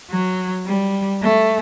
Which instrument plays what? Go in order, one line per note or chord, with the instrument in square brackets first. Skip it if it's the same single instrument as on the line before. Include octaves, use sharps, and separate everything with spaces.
[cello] F#3
G3
A3